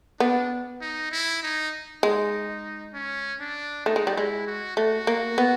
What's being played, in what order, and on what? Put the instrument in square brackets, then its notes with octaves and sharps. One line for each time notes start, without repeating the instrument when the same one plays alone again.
[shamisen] B3 [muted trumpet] D4
[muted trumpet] D#4
E4
D#4
[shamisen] G#3 [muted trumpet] D#4
[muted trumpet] C#4
D4
[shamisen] A3 [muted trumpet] D#4
[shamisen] G#3
G3
[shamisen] G#3 [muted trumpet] E4
[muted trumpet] F#4
[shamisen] A3 [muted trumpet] F#4
[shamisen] A#3
B3